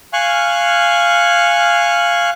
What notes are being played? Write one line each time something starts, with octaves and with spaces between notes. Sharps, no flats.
F5 G#5 C#6 F6 F#6